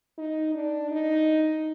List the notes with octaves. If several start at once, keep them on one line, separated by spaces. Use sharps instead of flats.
D#4
D4
D#4